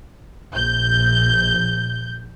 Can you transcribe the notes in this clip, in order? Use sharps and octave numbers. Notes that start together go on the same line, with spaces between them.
A#1 G6